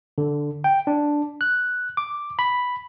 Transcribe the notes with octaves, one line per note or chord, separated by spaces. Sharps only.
D3
G5
D4
F#6
D6
B5